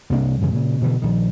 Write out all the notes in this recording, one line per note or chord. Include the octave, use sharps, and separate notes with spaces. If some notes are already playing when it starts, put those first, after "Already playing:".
C2 C3 A#3 D4
F#2 C#3 E3
A#2 C#3
B2 D3 E3
A#1 D#3